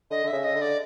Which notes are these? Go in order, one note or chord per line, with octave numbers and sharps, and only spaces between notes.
D3 D#5
D3 E5
C#3
D#5
D3
D5